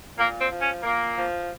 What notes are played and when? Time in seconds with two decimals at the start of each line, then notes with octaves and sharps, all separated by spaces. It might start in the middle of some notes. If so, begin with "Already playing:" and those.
0.17 A#2 A#3
0.39 C4
0.50 F3
0.61 C#4
0.82 A#2 A#3
1.15 F3